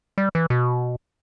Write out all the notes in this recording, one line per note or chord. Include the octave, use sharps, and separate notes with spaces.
G3
E3
B2